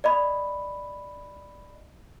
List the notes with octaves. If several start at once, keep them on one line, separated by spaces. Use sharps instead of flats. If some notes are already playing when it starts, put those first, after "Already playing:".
D5 D#5 B5